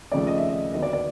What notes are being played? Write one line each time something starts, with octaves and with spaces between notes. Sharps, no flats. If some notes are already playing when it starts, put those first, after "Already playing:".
D#2 C#3 F3 A3 D5
D#5
E5
D#5
D#2 D3 F#3 B3 D#5
D5
D5